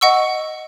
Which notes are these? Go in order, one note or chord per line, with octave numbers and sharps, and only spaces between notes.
D#5 F#5 C#6 E6